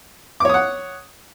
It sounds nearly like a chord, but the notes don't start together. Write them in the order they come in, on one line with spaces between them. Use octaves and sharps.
D6 C#5 D#6 F#5